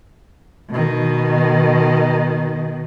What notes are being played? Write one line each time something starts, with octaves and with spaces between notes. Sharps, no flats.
B2 D#3